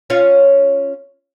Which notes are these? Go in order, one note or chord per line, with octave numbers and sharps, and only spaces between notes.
C#4 F4 C#5